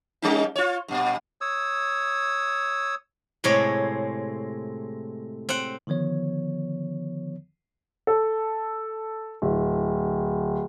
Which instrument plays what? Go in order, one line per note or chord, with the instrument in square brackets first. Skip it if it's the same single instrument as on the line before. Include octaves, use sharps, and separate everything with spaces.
[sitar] G3 C#4 D#4
F4 C#5
G2 A#2
[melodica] C#5 D#6 E6
[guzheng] A2 C3 G#3 C4 C#5
C4 F#5
[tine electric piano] D3 D#3 F3 B3 C#5
[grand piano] A4
D1